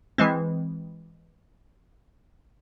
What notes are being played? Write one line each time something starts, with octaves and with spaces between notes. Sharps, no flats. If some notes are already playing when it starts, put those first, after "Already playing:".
E3 G#3 C4